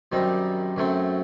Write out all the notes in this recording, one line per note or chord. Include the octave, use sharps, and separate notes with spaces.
F#2 D#3 G3 C4 D#4
F#2 F#3 A3 C4